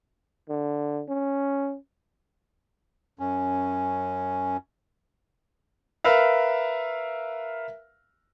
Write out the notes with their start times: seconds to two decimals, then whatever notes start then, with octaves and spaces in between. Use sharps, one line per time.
0.49 D3
1.09 C#4
3.19 F#2 C#4
6.04 A#4 B4 E5 F5